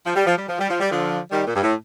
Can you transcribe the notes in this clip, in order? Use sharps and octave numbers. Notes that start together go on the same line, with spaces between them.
F3
G3
F3
G3
F3
G3
F3
G3
D3 F3
D#3 G3
A#2
G2
A2